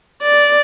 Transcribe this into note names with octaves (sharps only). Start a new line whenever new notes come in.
D5